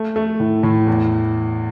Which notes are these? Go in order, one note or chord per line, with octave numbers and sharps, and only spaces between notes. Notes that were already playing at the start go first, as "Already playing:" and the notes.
Already playing: A3
A3
A2
A2
E2